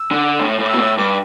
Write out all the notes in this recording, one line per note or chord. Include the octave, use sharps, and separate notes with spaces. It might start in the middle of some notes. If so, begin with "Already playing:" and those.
Already playing: E6
D3
A2
A2
D6
E6
B2
A2
G2 D6